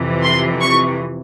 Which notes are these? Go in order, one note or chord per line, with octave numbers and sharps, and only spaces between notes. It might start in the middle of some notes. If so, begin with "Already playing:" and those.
Already playing: F2 C3 E3
C6
C#6